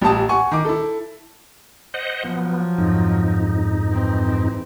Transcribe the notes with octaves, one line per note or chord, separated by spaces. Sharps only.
A1 A#2 G4 A5 D#6
F#5 G#5 C#6
D#3 D6
E4 A4
C5 D#5 F#5
F3 F#3 B3
F2 G#2 D#4
E3 C4